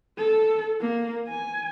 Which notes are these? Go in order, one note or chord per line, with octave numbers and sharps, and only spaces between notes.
A4
A#3
G#5